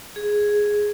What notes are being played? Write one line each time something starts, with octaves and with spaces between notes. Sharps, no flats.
G#4